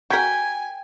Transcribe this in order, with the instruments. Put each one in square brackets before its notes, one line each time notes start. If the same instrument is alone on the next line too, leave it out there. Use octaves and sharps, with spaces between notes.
[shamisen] F#4 A#4 [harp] G5 G#6 B6 [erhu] G#5